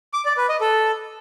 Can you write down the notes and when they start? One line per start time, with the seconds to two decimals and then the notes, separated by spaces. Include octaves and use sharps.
0.13 D6
0.25 D5
0.37 B4
0.49 D#5
0.61 A4